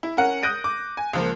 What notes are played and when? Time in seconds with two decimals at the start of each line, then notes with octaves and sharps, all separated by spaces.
0.03 E4
0.17 C#4 A#4 F#5
0.42 D#6 F#6 G6 A#6 D7 D#7
0.64 D6
0.97 G#5
1.13 C#2 F3 A#3